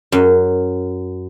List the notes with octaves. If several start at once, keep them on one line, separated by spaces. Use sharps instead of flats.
F#2